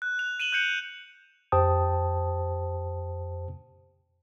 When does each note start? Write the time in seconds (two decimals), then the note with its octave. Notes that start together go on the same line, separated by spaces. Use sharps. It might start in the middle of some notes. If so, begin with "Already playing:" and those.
0.02 F#6
0.19 F7
0.40 D#7 E7 F#7 G7
0.52 F#6 G6 C#7 F7
1.52 F2 G4 C5 G5 A5 D#6